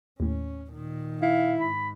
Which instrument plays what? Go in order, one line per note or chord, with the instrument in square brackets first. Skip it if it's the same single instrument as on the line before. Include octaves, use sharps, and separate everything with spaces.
[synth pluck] D#2 A2 [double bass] C#4
[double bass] A#2 D#3
[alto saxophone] E4 [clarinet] F5
[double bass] G#2 [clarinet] B5